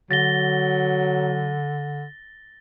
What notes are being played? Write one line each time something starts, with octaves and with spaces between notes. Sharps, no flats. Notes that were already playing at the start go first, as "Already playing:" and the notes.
D3 F#3 A6 A#6 G7